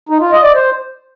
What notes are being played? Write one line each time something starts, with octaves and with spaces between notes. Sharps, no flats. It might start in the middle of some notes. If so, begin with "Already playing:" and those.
D#4
F4
D#5
D5
C5